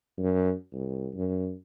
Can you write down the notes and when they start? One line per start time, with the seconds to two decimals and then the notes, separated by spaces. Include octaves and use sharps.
0.17 F#2
0.73 C2
1.14 F#2